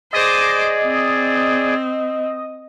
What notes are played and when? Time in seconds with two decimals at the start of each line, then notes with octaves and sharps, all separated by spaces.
0.13 G#4 C5 D5 D#5 D6
0.84 C4